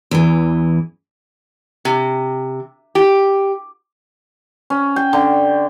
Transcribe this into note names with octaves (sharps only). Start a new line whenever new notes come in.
E2 E3
C3
G4
C#4
G5
D3